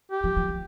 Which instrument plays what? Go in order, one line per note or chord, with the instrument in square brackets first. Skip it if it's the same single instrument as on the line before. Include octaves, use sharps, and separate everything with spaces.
[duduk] G4
[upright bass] F3
F3
F3